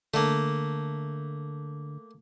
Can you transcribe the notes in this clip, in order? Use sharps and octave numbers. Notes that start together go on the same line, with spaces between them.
D3 A3 A#3